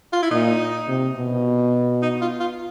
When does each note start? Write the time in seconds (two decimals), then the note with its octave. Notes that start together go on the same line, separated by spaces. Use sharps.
0.13 F4
0.22 E4
0.31 A#2 D#4
0.88 C3
1.17 B2
2.03 D#4
2.21 F4
2.40 F4